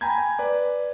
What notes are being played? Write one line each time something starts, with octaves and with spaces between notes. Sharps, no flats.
G5 G#5 A#5 B5 G6 G#6
B4 D5